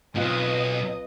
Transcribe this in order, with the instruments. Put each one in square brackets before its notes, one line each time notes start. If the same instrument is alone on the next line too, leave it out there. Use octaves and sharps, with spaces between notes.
[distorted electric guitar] B1 G#2 [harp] C4 F4 B4 [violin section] D#5 D#6